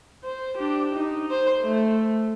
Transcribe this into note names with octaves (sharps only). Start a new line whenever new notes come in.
C5
D4 G4
D#4
C5
A3